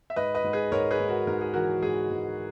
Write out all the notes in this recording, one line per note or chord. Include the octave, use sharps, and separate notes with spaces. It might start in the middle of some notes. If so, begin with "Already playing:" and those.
E5
G#2 B4 D#5
B4 D#5
G#2
G#4 B4
G#2 A#4 C#5
G#4 B4
G#2
F#4 A#4
G#2 A#4
G#4
E3 F#4 A#4
G#2 G#4
G#2